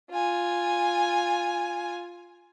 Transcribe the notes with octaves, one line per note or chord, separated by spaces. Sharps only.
F4 G#5